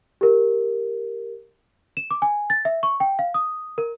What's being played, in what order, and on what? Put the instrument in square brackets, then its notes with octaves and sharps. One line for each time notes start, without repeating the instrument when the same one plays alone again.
[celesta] G4 A#4
E7
D6
G#5
A6
E5
C#6
G5
F5
D#6
A#4